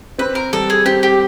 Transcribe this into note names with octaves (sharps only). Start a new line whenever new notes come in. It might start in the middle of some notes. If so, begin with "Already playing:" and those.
C4 B4
A#4
G3 A4
G#4
C4 G4
G4